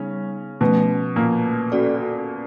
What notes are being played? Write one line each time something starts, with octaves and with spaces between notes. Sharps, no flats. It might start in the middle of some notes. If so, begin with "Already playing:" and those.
Already playing: C#3 G3 B3 C#4 D#4
B2 F3 A3 B3 C#4
A#2 A#3
C#4 F#4 A4 D5